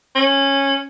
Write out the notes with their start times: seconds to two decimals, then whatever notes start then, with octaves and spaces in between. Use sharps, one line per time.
0.15 C#4